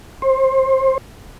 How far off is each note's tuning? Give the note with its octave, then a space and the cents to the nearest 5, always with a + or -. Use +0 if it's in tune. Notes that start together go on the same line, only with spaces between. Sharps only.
C5 +25